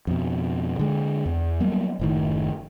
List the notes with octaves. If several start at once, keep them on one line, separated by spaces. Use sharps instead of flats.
F2 B2
D3 G#3
E2
F#3 G3 A#3 B3
F#1 A2 D#3